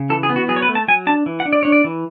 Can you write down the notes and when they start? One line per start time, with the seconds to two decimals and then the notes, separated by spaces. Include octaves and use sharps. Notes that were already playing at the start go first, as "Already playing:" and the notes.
Already playing: C#3
0.10 E3 A4
0.23 G#4
0.29 B3
0.36 F#4
0.48 F#3 G#4
0.56 C#5
0.62 B4
0.68 A3
0.75 A5
0.88 F#3 G#5
1.07 D4 A5
1.26 E3
1.40 F#5
1.45 D4
1.53 D5
1.63 D4 C#5
1.72 D5
1.84 E3